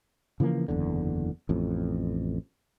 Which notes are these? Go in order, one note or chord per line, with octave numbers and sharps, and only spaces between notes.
C#3 E3 F3 A#3
F#1 E2 D3
A1 F2